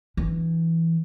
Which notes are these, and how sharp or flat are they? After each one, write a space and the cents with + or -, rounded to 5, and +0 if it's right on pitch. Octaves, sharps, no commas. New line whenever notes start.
E3 +0 D4 +0